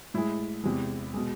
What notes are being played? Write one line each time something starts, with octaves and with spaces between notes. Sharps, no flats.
A2 G#3 E4
E2 C3 G#3
B2 G#3